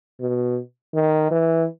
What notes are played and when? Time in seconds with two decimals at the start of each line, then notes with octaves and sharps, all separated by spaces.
0.21 B2
0.94 D#3
1.31 E3